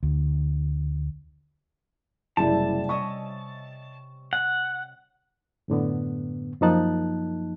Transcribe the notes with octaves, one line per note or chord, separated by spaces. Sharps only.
D2
F#1 C3 G3 E4 A5
C#4 D#5 E5 C#6
F#5
F#2 A2 D3 B3
F#2 F3 A#3 D#4 A5 F#6